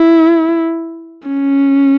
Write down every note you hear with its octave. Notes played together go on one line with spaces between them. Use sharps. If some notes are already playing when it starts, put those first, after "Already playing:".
Already playing: E4
C#4